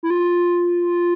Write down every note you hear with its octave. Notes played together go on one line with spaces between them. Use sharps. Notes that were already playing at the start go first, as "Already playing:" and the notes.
E4
F4